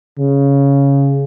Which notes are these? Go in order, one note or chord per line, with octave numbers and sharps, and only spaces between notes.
C#3